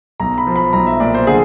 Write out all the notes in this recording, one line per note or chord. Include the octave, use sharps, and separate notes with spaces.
B1 A#5
B5
F3
B5
B1 A#5
E5
A#2 D5
C5
D3 G#4